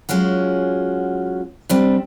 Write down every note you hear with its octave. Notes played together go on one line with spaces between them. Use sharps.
F#3 G#3 C#4 F4 F#4
G3 C4 D4